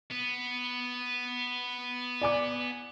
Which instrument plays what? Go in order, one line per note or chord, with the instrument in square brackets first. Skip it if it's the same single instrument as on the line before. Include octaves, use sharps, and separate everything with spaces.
[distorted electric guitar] B3
[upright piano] D5 G#5 D6